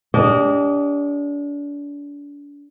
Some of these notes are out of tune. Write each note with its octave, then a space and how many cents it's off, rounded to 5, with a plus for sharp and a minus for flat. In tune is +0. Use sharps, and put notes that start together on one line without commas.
D4 -35 G4 +25 D#5 -10